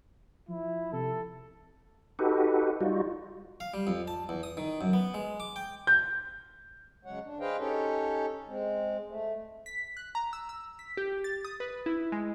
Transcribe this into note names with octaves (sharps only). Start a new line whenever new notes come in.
F3 E4
C3 A4
D#4 F#4 G4 A4 B4
G3 D#4 F4 F#4
F5
G3
F2
A5
E2
D#6
D#3
F#2
B3
G#3
D6
G5
G6
C#3 F#3 G#3 C#5 F#5
D4
G#4 B4 C5 D#5 F5 G5
C#4 D#4 G4 A4 C#5
G#3 C4
A3
B6
F#6
A#5
E6
E6
B6
G4
A6
D#6
B4
E4
G#3